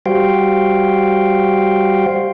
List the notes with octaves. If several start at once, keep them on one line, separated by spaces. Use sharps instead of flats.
G3 F#4 C5 F5 G5